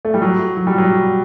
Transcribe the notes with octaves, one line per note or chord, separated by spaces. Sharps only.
A3
G3
F#3
F#3
G3
F#3